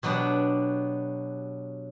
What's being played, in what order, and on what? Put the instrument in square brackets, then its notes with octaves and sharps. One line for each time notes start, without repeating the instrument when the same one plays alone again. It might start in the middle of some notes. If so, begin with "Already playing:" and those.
[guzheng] B2 F#3 B3 D4 G4